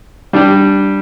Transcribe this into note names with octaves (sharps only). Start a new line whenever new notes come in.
G3 D4 G4